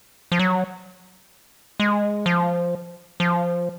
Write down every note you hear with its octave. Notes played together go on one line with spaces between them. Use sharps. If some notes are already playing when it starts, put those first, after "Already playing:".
F3
F#3
G#3
F3
F3